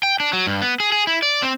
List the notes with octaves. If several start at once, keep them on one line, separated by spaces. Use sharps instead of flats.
G5
D4
F#3
G2
B3
G#4
G#4
E4
D5
C4